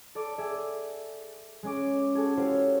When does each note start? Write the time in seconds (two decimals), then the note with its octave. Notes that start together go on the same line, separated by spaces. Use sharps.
0.15 A4 D5 D6
0.38 G#4 D5 E5
1.63 G#3 C#4 D6
2.15 F#4 G#4 A4
2.37 E4 F#4 G4 C5 C#5 F5